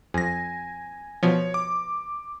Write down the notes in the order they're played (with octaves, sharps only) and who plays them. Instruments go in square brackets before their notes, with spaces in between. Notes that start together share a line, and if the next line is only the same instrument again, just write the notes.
[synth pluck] F2 [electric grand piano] G#5 A#6
[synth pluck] B2 F3 [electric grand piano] C#5
[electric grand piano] D6